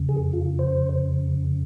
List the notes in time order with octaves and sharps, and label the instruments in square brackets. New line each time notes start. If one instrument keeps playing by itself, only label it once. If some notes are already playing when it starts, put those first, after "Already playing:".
Already playing: [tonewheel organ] F2 C#3
G#4
F4
C5